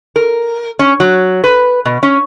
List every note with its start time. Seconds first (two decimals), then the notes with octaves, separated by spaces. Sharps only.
0.16 A#4
0.79 C#4
1.00 F#3
1.44 B4
1.85 B2
2.03 C#4